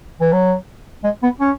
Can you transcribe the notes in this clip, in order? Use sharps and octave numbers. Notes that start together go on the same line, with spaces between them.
E3
F#3
G#3
B3
C#4